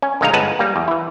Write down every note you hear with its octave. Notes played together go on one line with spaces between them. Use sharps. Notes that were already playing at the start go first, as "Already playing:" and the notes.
C#4
A#1 D3 G#3 D#4 F5 A#5
G1 G#3 C#4 B4 F#5 A5
G3 A#3
E2
E3 E4